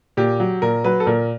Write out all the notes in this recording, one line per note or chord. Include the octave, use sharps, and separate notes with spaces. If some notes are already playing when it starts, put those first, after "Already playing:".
A#2 G4
F#3
A#2 A#4
F#3 B4
A4
A#2 A#4